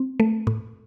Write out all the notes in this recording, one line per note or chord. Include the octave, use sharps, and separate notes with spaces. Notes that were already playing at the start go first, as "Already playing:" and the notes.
Already playing: C4
A3
A2